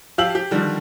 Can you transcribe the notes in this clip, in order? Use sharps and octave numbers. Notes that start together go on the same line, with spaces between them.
F3 G4 F5 E6 F#7
G4
D3 D#3 F3 G3